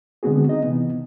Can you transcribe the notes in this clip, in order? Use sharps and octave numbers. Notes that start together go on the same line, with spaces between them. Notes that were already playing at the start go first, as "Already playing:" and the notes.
D3 G#3 B3 C4 F#4 G#4
C4 D#4 D#5
C3 E3 B3